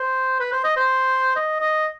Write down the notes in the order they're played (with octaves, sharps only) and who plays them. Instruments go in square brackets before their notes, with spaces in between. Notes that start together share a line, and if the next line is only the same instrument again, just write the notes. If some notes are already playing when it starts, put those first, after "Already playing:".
Already playing: [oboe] C5
B4
C5
D#5
C5
D#5
D#5